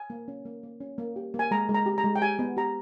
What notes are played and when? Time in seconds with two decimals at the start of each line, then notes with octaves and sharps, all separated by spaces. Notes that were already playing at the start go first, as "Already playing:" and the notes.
Already playing: G#5
0.10 A#3
0.28 C#4
0.45 A#3
0.63 A#3
0.80 C#4
0.98 A#3
1.16 G4
1.34 A#3
1.39 G#5
1.51 G#3 A#5
1.69 G#3
1.75 A#5
1.86 G4
1.98 A#5
2.04 G#3
2.16 G5
2.22 G4 G#5
2.39 B3
2.57 G4 A#5